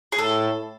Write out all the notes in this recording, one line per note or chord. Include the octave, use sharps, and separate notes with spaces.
G#4
A2 A4